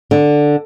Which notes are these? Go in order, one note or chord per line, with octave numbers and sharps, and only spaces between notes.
D3